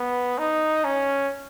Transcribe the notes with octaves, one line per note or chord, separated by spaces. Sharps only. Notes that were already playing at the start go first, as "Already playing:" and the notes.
Already playing: B3
D#4
C#4